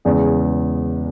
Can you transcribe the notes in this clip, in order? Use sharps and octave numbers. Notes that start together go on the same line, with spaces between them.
E2 C#3 G#3